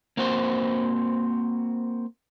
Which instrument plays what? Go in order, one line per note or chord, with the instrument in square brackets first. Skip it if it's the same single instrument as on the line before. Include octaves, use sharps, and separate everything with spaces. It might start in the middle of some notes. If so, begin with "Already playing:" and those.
[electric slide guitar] A#3 C4 F#4 C5